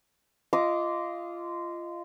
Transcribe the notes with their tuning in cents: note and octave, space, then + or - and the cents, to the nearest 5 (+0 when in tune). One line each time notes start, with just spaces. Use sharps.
F4 -20 D#5 +0 D6 -15